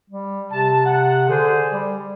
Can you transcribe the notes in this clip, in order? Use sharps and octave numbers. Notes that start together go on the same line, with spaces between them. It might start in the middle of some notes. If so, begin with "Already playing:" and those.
G3
C3 A5
F#5
D3 G#4 C5 D5
G3